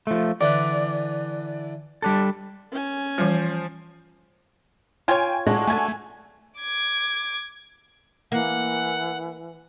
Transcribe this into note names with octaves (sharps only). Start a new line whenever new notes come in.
F3 A3
D3 E3 D5 B5
G3 D4 A4
C#4 G#5
E3 F3 G3 C5
F4 C#5 G5 G#5 G#6
A2 G#3 D4 F#4
A3 G#5 G#6
D6 G#6
E3 A#3 F#5